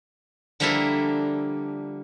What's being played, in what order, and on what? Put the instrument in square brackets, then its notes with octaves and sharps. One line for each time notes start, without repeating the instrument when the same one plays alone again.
[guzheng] D3 F3 G3 A#3 E4 A4